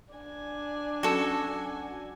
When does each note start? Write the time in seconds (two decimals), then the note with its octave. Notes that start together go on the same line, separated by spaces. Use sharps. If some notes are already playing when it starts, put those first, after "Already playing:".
0.14 D4 G#5
1.03 F#3 C#4 F#4 A4